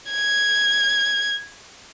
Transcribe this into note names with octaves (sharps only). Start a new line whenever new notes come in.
G#6